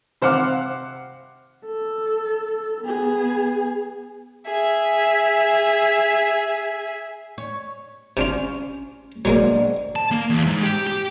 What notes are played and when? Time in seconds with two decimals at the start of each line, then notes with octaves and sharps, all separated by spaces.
0.22 C3 C5 F5 F#5 D6 F6
1.66 A4
2.81 B3 G#4
4.47 G#4 E5
7.38 C#5
8.17 C3 C#4 D4 F4
9.25 B2 F#3 G#3 A#3 C4 D4
9.96 A5
10.12 A#3
10.30 E2
10.47 G#2
10.63 G4
10.87 G4